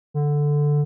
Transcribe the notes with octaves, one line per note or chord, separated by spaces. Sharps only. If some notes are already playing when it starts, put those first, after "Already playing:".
D3